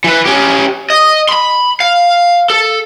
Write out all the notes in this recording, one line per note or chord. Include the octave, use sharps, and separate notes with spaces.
E3 B4
C#4 G4
D#5
B5 C6
F5
A4